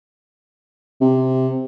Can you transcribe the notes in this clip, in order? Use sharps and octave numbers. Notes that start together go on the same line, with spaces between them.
C3